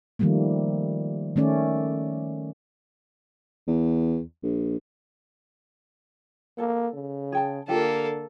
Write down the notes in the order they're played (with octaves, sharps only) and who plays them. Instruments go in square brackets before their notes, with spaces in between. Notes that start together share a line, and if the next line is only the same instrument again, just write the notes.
[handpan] D#3 F3 G3 A3 A#3
D#3 A3 C#4 D5
[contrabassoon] E2
A#1
[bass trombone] A#3 [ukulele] A4 A5
[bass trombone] C#3
[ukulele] G#4 G5 A5
[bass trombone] D3 [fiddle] A#3 A4 [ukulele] F4 G4 F5